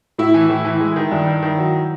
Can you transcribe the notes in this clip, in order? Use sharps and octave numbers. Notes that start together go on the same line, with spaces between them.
A2 E4
E3
A2
E3
G#3
D#3
G2
D#3
D#3
F#3